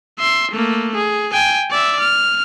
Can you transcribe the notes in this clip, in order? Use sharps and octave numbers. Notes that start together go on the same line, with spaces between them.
E5 C6
A3 A#3
G#4
G5 G#5
D5 E5
F6